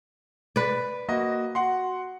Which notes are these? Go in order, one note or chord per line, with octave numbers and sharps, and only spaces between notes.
B4 D5
A#3 F#4 D#5
F#4 F#5 C6